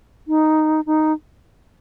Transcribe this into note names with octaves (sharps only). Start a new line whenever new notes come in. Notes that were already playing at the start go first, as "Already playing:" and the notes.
D#4
D#4